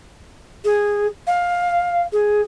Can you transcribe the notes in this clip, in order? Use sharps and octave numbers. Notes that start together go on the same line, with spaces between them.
G#4
F5
G#4